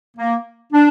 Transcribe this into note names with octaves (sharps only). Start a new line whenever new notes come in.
A#3
D4